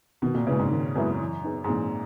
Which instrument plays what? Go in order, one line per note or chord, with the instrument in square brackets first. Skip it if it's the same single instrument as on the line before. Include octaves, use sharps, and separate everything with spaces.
[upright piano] B2 [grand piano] D#3
[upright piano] A#2
[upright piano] C#3 [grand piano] G#3 B3 E4 B4
[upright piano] G#2
[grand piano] D#3
[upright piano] F#2 [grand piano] G#3 B3 E4 B4
[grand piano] E3
B3 D#4 G#4
[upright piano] G#2
[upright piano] A#2 [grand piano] E3